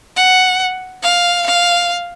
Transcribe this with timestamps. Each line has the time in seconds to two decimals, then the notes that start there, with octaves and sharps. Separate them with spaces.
0.16 F#5
1.03 F5
1.47 F5